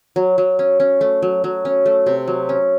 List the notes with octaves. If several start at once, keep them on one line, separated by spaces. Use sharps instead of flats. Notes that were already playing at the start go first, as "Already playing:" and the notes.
F#3
F#3
C#4
C#4
A3
F#3
F#3
C#4
A3
C3
F#3
C#4